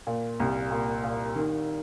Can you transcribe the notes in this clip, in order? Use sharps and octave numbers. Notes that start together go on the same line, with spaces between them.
A#2
C2
A#2
A#2
D#3